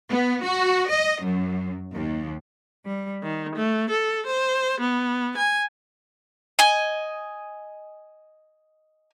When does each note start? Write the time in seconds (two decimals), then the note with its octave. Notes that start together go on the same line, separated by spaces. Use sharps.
0.10 B3
0.44 F#4
0.90 D#5
1.23 F#2
1.95 D#2
2.85 G3
3.23 D#3
3.54 A3
3.90 A4
4.27 C5
4.81 B3
5.37 G#5
6.59 D#5 G#5